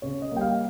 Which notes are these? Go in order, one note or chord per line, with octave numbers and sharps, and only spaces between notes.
C#3 C#5
D#5
G3 A#3 G5
F5